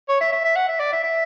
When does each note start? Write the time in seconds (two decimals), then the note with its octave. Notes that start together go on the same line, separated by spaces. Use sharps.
0.09 C#5
0.21 E5
0.32 E5
0.44 E5
0.56 F#5
0.68 E5
0.80 D5
0.92 E5
1.04 E5